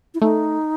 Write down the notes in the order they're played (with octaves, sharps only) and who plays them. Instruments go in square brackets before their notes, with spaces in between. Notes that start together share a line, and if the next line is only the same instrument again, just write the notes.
[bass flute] E4
[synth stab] A3 [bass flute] D#4